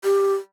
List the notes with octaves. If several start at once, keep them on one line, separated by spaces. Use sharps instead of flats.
G4